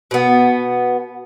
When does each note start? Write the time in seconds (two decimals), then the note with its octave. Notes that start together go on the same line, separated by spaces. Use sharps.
0.11 B2 B3